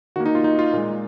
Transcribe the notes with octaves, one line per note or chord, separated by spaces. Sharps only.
D#3 A#3 F#4
D#4
F4
D#4
F4
A#2 G#3